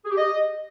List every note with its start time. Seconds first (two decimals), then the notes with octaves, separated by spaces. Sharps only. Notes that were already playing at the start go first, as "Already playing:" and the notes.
0.04 G#4
0.11 G4
0.17 D#5